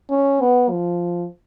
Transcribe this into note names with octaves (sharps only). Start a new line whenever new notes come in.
C#4
B3
F3